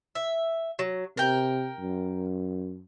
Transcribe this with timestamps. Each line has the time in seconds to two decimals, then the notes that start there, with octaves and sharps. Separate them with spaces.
0.15 E5
0.79 F#3
1.17 C3 A#4 G5
1.80 F#2